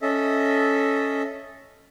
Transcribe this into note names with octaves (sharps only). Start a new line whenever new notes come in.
C#4 A4 D#5 E5